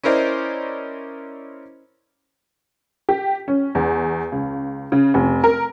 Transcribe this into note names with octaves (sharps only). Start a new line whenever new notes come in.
C#4 E4 A#4 C5 D5 D#5
G4
C#4
E2
C#2
C#3
F1
A#4